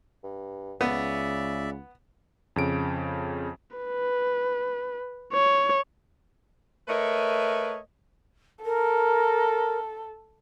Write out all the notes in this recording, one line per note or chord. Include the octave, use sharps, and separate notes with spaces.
G2
C#2 C#3 B3 D5 E5
F2 C#3 D7
B4
C#5
A3 A#4 B4 C#5 D#5 E5
A4 A#4